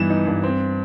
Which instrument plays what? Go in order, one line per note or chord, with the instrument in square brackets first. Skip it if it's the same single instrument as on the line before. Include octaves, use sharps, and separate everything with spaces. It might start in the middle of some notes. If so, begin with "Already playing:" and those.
Already playing: [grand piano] G2 E3 B3 D#4 E7
D#4
G2
C4